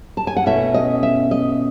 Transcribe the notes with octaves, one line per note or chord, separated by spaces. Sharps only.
A5
G#5
F#5
B2 A3 C#4 E4 E5
D#5
E5
D#5